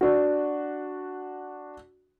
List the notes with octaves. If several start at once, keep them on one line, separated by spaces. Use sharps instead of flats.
D4 F#4